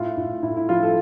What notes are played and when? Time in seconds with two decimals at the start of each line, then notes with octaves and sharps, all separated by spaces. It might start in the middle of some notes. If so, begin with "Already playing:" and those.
Already playing: A2 F4
0.17 A2
0.43 A2 E4
0.56 E4
0.69 F3 F4
0.83 A4